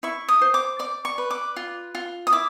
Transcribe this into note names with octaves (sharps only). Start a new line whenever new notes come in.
E4 C#6
D#6
C5
D6
D5 D6
C#6
B4
D6
F4
F4
D#6
E4 D6